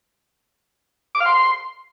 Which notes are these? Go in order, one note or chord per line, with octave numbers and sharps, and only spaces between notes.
D6
F5
C6